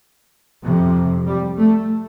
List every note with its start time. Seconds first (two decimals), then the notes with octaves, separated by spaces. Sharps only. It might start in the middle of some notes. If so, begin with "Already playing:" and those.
0.62 F2 C3
1.27 G3
1.59 A3